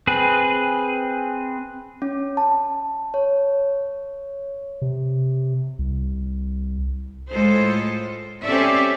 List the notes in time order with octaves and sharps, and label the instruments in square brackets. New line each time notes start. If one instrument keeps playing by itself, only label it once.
[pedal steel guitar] C4 G#4 B4
[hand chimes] C#4
A5
C#5
[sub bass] C3
C2
[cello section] A2 G#3 F4 A4 C5
C4 C#4 G4 A4 D5 E5